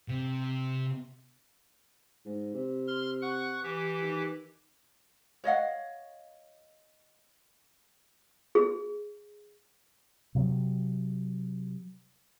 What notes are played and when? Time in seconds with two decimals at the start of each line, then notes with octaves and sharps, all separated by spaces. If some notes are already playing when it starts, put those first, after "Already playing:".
0.08 C3
2.25 G#2
2.54 C3
2.88 C6 F6
3.22 F#5 C#6 F#6
3.63 E3 G4
4.01 D#3
5.44 C#5 D#5 F5 F#5
8.55 G#4
10.35 C3 F#3